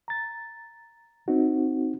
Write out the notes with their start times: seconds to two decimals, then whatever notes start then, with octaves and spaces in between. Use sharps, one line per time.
0.08 A#5 A6
1.28 C4 D#4 F#4